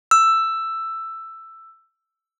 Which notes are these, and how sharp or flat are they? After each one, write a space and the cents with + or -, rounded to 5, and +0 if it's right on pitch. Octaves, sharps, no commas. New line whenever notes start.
E6 +10